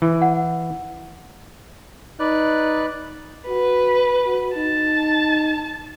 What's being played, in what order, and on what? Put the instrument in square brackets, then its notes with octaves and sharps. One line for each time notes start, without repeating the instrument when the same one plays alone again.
[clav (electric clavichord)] E3
[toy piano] F#5
[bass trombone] D#4 [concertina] B4 D5 F#6
[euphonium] F#4 [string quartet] B4
[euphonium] F#4
[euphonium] D#4 [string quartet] A5